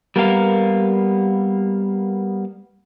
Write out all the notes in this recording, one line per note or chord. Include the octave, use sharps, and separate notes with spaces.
G3 A#3 B3 A#4 F5